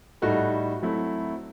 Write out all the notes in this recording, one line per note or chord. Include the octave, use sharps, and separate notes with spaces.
A2 G3 D#4 F#4 A4
F#3 A3 C4 E4